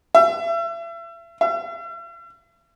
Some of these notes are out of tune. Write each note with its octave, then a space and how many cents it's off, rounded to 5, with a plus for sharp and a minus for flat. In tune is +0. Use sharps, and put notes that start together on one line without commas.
E5 +35
E5 +45